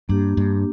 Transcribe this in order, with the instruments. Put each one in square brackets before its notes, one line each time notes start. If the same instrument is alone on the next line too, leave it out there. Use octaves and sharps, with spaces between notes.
[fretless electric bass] G2 [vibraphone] A#3 D4 G4
[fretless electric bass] G2